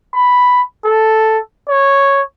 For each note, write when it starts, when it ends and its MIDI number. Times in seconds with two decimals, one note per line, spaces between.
0.14 0.62 83
0.85 1.39 69
1.68 2.23 73